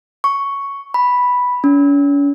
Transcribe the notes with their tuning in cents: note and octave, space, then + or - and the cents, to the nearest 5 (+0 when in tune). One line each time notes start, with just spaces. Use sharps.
C#6 +5
B5 -5
C#4 +40